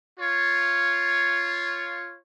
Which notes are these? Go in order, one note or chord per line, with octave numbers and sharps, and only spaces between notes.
F4 C#5